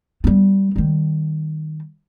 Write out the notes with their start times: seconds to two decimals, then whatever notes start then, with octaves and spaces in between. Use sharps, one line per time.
0.24 G3 B3
0.76 D#3 G3